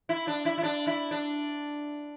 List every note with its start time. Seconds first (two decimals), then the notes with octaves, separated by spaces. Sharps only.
0.09 E4
0.27 D4
0.45 E4
0.58 E4
0.63 D4
0.87 E4
1.11 D4